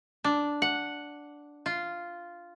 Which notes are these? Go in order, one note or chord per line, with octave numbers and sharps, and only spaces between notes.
D4
F#5
F4